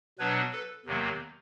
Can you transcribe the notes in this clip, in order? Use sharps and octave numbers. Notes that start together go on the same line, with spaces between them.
B2 F#3 B3 D4 B4 C#5
A4 B4
E2 C3 D#3 F#3 A#3